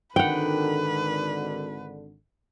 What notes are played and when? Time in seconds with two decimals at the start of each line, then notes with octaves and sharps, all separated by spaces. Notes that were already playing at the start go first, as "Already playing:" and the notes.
0.16 G#1 D3 D#3 B4 F#5 G5